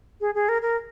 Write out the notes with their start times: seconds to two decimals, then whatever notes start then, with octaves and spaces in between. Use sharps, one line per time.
0.21 G#4
0.35 G#4
0.49 A#4
0.62 A#4